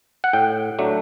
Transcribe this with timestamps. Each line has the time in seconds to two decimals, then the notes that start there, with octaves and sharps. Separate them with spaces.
0.24 F#5
0.33 A2 G5
0.79 F#3 A3 D4